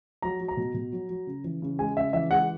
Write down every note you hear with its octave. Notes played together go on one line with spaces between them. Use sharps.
F#3 A#5
F#3
A#5
B2
B2
F#3
F#3
C#3
E3
C#3
G#3 G#5
C#3 E5
E3 E5
G#3 F#5